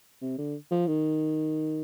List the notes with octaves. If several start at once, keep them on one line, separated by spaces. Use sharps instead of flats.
C3
D3
F3
D#3